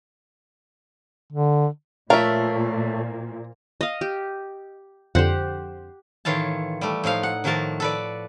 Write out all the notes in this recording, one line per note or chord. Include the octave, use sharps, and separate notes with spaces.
D3
A#2 F3 A3 A#4 C#5 E5 F5
D#5 F5
G4
F2 D3 G4 C5 F#5
A2 D#3 E3 F4 C#5 A5
G3 A3
A2 F3 D#4 F5
F#5
A2 D#3 F3 F#4 A#4 A5
A4 B4 D5